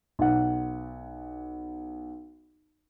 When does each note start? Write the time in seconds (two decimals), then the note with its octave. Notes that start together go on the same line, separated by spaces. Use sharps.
0.19 B1 F#5